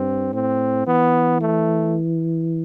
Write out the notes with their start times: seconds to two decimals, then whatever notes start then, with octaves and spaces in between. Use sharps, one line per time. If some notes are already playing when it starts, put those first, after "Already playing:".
Already playing: G2 C4
0.33 A2 C4
0.87 E3 B3
1.41 A3